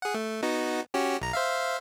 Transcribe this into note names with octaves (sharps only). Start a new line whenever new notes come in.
G#4 F#5
A3
B3 D#4 F#4
C#4 F#4 G4
B1 A#5
C5 E5 F5